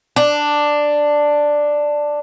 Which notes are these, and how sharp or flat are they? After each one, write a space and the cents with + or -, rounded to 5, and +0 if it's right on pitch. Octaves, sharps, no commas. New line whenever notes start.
D4 +5